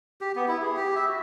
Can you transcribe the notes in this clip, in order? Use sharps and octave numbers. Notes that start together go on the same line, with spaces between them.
G4
B3
E4
G#4
G4
E5
F#4